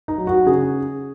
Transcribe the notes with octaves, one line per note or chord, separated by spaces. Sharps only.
D#4
F#3
F#4
C#3 G#4